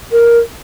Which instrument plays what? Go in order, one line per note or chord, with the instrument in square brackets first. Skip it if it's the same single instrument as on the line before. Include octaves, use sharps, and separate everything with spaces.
[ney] A#4